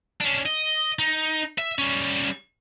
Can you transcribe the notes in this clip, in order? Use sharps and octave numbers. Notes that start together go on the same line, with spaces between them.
C#4 D4
D#5
D#4
E5
G3 C#4